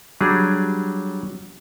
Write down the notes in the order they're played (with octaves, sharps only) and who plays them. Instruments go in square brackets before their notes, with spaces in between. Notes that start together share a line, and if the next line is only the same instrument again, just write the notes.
[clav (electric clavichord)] F#3 G3 D4 G#4